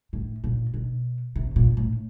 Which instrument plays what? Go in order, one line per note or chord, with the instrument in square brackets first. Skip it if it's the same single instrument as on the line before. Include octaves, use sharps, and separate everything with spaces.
[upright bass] A2
A#2
B2
C3
A#2
A2